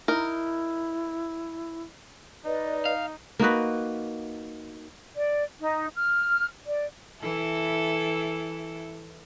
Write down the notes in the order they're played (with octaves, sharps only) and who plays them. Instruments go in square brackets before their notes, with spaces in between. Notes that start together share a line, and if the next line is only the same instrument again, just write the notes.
[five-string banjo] D#4 A#4 [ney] E4
[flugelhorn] D#4 [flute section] B4 D5 D#5
[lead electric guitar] F5
[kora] A#3 D#4 F#4 B4
[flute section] D5
D#4
F6
D5
[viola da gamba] E3 E4 A4